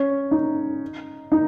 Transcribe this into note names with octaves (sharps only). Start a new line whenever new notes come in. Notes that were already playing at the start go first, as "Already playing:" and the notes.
Already playing: C#4
D#4
D#4